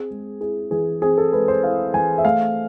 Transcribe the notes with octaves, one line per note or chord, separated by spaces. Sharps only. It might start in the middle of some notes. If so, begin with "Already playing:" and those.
Already playing: C4 G#4
G#3
E4 G#4
E3 G#4
C4 G#4
A4
G#3 B4
C5
E4 F5
E3 G#5
E5
A3 F5